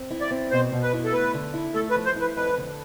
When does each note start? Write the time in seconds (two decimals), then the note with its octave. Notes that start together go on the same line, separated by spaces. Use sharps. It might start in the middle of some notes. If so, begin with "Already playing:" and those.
Already playing: C4
0.11 E4
0.21 D5
0.31 C4
0.51 B2 C5
0.72 B2
0.83 B4
0.93 E4
1.05 A4
1.13 A3 B4
1.34 D3
1.54 E4
1.74 A3 A4
1.90 B4
1.96 F3
2.06 C5
2.16 E4
2.21 B4
2.36 F2 B4
2.58 D3